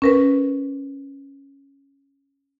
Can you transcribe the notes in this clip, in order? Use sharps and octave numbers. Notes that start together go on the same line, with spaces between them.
C#4 A#4 B4